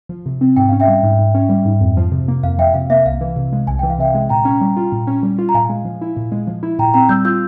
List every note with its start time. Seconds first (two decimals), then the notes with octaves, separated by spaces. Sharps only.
0.09 F3
0.26 C3
0.41 C4
0.56 G#2 G5
0.69 C#4 F5
0.80 E5 G5
0.88 G3
1.03 G#2
1.19 G#2
1.35 C#4
1.49 G3
1.65 G#2
1.81 F2
1.97 F3
2.12 C3
2.28 A#3
2.43 F2 F5
2.58 F3 E5 G5
2.74 C3 F5
2.90 A#3 E5
3.05 C2 F5
3.21 E3
3.36 C3
3.53 G#3
3.67 C2 G#5
3.79 E3 G5
3.90 F5
3.99 C3 E5 G5
4.15 G#3
4.29 A#2 G5 A#5
4.45 C#4
4.61 G3
4.77 F4
4.92 A#2
5.07 C#4
5.23 G3
5.39 F4
5.49 A#5
5.54 A#2 F5 G#5
5.70 G#3
5.85 F3
6.02 E4
6.17 A#2
6.32 G#3
6.47 F3
6.63 E4
6.79 A#2 G5 A#5
6.94 C4 G5 A#5
7.09 G3 E6 G6
7.25 F4 E6 G6